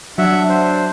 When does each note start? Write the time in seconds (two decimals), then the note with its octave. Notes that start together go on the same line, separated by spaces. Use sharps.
0.18 F#3 D4 E5 F#5
0.49 C5